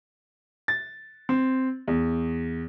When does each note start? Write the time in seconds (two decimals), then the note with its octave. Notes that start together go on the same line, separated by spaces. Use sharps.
0.68 A6
1.29 C4
1.88 E2